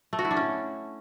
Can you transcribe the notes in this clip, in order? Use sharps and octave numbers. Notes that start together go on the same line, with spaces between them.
A3
F#4
E4
D4
C#4